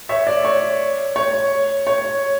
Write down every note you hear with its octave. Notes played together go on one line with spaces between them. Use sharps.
C#5 E5
D5
C#5
C#5
C#5